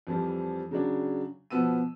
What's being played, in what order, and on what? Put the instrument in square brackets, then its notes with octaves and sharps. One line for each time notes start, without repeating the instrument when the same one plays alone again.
[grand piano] F2 E3 F3 G3
C#3 F#3 D4
B2 F3 B3 E6 D#7